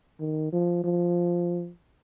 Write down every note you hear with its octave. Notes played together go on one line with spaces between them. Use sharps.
D#3
F3
F3